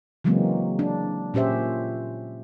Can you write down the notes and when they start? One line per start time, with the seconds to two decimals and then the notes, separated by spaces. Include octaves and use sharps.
0.24 C#3 E3 F#3 G#3 A#3 C4
0.79 D4
1.34 A#2 C#4 G4 C5 E5